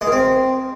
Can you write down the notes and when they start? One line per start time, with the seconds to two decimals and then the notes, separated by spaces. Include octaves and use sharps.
0.01 G#3
0.07 D#3
0.12 C4